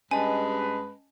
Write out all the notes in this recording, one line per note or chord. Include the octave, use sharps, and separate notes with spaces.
G2 G#3 C#4 B4 D#5 G#5 A5